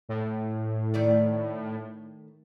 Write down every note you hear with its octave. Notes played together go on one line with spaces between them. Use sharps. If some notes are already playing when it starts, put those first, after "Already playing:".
A2
D#3 A3 D5